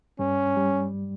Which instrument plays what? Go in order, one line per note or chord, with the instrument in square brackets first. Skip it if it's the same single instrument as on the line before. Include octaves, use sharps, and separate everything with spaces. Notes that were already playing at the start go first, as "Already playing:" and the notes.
[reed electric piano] G2 G3 [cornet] C#4
[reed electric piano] G3